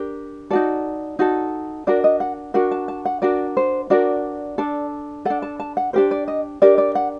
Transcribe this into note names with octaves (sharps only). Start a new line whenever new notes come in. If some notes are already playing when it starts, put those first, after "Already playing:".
Already playing: D4 G4 A#4
D#4 F#4 A4 D5
D#4 F#4 A4
D4 F#4 A#4 D5
D#5
F#5
D4 F#4 A#4 F#5
A5
A5
F#5
D4 F#4 A#4 D5
C5
D4 F#4 A#4 D5
D4 A4
D4 A4 F#5
A5
A5
F#5
D4 G4 A#4 C5
D5
D#5
D4 G4 A#4 D5
D5
F#5